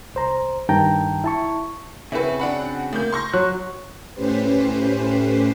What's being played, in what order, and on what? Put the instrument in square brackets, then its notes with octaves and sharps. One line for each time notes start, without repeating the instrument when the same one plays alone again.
[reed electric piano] C2 C5 A#5
G2 D#3 G5 A5 A#5
E4 A5 C#6
[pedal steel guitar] C#3 C4 F#4 [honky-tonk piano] E4 B4
[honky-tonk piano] D4 F#5 B5
A2 A#3 G6
C6 C#6 A#6
[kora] F#3 [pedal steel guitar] F#6
[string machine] A2 A3 C#4 G4 B4 C5